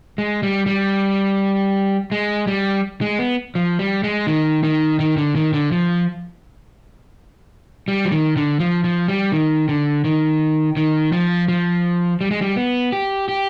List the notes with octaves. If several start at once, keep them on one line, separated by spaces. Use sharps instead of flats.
G#3
G3
G3
G#3
G3
G#3
B3
F3
G3
G#3
D#3
D#3
D#3
D3
D#3
D3
F3
G3
F3
D#3
D3
F3
F3
G3
D#3
D3
D#3
D#3
F3
F3
G3
G#3
G3
B3
G4
G4